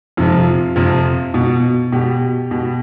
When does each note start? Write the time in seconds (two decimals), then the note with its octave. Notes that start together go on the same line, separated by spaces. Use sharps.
0.17 F2 C3 F3 F4
0.76 F2 C3 F3
1.34 B2
1.92 B2 G4
2.51 B2